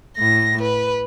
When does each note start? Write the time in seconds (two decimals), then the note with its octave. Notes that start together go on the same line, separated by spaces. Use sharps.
0.17 A2 A#6
0.62 B4